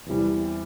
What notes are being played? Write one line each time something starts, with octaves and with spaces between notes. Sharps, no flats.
E2 C3 E3 G3